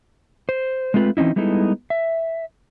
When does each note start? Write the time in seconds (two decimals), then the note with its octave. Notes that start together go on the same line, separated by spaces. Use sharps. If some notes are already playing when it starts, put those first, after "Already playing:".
0.49 C5
0.94 G#3 A3 C4 F4 B4
1.17 E3 C4 C#4 D#4 E4
1.36 G3 G#3 B3 D#4 E4 A4
1.90 E5